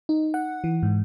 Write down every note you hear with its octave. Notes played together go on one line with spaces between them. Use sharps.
D#4
F#5
E3
G#2